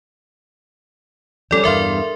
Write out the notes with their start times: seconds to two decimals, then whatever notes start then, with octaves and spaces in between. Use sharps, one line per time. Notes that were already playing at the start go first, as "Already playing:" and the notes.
1.51 F3 G3 C#4 A4 D5
1.64 E2 G2 A#4 E5 F5 C6